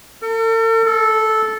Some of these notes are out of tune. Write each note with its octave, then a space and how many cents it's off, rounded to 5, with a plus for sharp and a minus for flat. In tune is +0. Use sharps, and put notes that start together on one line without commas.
A4 +45
A4 -10